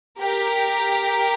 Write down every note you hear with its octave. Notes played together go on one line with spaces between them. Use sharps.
G4 A#4